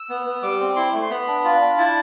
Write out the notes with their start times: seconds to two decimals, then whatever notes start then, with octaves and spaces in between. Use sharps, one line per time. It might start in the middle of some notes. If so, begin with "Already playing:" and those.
Already playing: E6
0.10 B3
0.26 B3
0.43 G3 D6
0.60 C4
0.76 E4 C6
0.94 A3
1.03 C6
1.10 B3 B5
1.28 D4
1.44 F4
1.61 D4
1.78 E4 A5